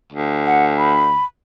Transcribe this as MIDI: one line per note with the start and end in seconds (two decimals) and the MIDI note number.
0.13 1.20 38
0.46 0.65 78
0.78 1.25 83